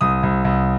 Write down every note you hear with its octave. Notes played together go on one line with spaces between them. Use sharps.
C2 D#6
C2
C2